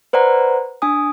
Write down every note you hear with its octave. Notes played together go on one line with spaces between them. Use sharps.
B4 C5 D5 F#5 A#5
D4 G#5 D#6